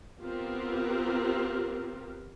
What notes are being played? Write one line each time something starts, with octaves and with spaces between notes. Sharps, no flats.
B3 C4 F4 G4 A#4